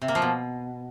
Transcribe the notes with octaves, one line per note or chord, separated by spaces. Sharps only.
C3
A#3
F3
B2